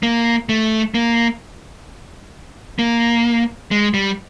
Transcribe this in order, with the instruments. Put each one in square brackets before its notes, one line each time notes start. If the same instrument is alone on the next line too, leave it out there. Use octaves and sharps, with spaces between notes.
[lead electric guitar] A#3
A3
A#3
A#3
G#3
G3